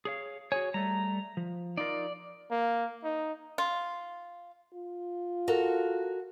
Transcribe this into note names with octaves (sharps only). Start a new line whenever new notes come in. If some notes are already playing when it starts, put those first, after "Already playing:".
G#4 C#5 F5
F#4 G#4 C#5 G#5
G3 A3 A#5
F3
D#4 F4 A#4 D5
A#3
D#4
F4
F4
F#4 A4 A#4